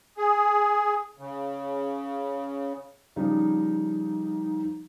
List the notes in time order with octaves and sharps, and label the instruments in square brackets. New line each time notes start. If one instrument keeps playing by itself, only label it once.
[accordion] G#4
C#3
[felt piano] C#3 F3 G3 [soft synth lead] D#4